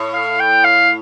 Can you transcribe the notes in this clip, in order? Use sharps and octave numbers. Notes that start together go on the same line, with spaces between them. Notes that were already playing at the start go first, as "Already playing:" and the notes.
Already playing: A2
F5
G5
F5